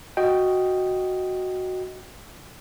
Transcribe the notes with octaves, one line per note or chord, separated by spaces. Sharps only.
F#4 D#5 G5